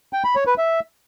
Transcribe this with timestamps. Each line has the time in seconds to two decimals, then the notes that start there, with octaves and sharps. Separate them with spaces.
0.13 G5
0.24 B5
0.35 C#5
0.47 B4
0.58 E5